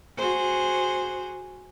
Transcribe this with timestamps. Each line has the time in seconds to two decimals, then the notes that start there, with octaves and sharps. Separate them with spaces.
0.17 F#4 G#4 C5